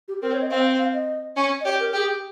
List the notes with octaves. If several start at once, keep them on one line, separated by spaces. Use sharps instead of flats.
G4
C4 A#4
C#5
D#5
C4 F5
F5
D#5
C#4
D#5
G4 C#5
A#4
G4 G#4